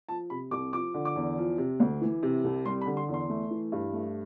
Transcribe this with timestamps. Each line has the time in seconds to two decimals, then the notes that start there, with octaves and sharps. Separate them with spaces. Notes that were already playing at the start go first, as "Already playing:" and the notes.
0.09 F3 A5
0.30 C3 B5
0.51 C2 D6
0.73 F3 D6
0.94 D3
1.05 D6
1.16 E2
1.38 F3
1.58 C3
1.80 D2
2.01 E3
2.23 C3
2.44 C2
2.65 G3 C6
2.81 B5
2.86 D3
2.97 C6
3.08 E2
3.14 C6
3.30 A3
3.51 E3
3.72 G2
3.93 A3